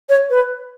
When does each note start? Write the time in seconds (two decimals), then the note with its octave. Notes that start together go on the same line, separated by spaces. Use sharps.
0.09 C#5
0.30 B4